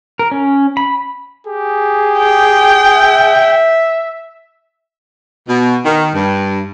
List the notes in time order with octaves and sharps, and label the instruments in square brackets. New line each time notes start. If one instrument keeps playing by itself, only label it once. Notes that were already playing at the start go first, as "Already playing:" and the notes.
[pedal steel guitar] A#4
C#4
B5
[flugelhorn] G4 [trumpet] G#4
[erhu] G5
[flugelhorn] E5
[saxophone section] B2
D#3
G2